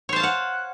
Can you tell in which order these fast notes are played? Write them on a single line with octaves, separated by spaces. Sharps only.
C#5 C5 A5 F5 F#5